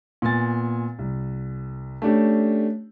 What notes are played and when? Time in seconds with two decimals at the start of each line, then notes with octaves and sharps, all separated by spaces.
0.22 A#2 B3 G#5 A6
0.99 C2
2.02 A3 C#4 D4 G4